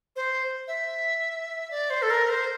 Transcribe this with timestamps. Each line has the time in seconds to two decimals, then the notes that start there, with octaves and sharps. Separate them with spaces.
0.16 C5
0.68 E5
1.71 D5
1.90 C5
2.02 A4
2.10 A#4
2.29 C5